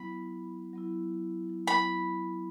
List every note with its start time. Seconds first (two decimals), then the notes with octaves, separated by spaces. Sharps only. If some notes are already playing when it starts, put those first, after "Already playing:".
Already playing: F#3 B3 E4 B5
0.73 F#3 B3 E4
1.67 F#3 B3 E4 B5